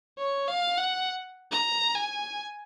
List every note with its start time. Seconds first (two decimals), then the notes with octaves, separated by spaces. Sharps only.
0.17 C#5
0.48 F5
0.77 F#5
1.51 A#5
1.95 G#5